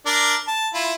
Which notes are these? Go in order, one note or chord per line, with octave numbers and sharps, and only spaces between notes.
D4 A#4 D5
A5
E4 F4